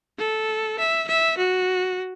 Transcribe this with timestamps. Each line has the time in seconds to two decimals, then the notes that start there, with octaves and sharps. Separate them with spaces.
0.19 A4
0.79 E5
1.08 E5
1.38 F#4